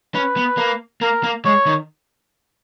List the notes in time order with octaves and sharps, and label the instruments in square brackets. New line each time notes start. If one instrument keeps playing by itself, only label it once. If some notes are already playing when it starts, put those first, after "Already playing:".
[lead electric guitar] C#4 [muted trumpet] B4
[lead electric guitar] B3
A#3
[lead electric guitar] A#3 [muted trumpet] A#4
[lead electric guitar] A#3
[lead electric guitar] G#3 [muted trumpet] C#5
[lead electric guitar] D#3